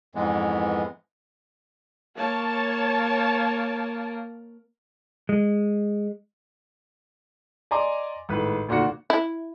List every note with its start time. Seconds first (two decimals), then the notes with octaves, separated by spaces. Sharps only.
0.15 F2 G#2 E3 G#3 B3
2.17 A#3 C#5 A5
5.29 G#3
7.71 D5 D#5 G#5 A#5 C6 D6
8.29 G#1 A2 B4
8.69 D2 A#2 D#3 F#4 C#7
9.10 E4